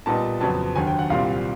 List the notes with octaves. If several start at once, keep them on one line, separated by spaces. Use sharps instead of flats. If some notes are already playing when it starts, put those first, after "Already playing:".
A#2 G3 B3 D#4 A5
F2 C#3 F#3 B3 A5
D#2 D3 F#3 G#5
G5
F#5
C2 A#2 G3 C4 F5